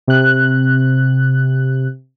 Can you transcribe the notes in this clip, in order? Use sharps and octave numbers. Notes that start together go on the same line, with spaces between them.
C3 F#6